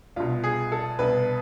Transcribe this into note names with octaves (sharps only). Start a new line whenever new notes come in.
C2 B2 F4
G#4
A4
C2 B2 B4